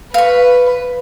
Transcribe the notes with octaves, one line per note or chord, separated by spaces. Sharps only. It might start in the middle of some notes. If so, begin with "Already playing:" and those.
B4 F5 C#6